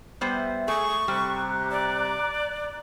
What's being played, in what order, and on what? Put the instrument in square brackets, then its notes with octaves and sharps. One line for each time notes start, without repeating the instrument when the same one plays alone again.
[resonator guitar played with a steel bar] G3 B3 C5 [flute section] E5
[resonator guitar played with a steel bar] A3 [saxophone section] G#4 [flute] C#6
[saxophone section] C3 [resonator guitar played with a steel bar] G3 [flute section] A#5 D6 F#6
[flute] D5